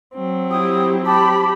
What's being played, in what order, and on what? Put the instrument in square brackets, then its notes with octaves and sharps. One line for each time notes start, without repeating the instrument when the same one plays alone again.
[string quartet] F#3 C4
[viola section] E4 G4 [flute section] G5 D#6
[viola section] G4 B5 [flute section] A5 D6